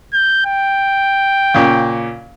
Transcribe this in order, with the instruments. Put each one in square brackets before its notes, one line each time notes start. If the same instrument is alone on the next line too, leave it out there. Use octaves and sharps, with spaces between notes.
[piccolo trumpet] G6
G5
[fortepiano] A#2 C#3